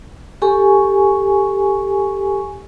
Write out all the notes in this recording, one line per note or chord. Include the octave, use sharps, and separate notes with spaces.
G4 A4 G#5 C#6